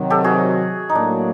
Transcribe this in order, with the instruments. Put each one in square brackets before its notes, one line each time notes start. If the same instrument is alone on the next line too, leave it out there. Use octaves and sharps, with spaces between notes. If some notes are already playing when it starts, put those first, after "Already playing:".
Already playing: [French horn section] C3 D#3 F#3
[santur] G4 A4
F#4 G#4
D#4
[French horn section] A2 F#3 A#3 [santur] D4